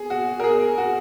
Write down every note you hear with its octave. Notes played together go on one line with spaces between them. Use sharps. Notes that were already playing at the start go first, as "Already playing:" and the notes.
Already playing: G#4
F#4
A#4
G#4
F#4